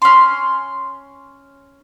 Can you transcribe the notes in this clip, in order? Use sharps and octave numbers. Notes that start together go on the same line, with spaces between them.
C#4 C6